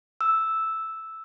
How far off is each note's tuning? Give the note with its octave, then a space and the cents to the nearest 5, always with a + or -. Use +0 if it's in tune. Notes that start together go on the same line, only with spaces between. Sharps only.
E6 -5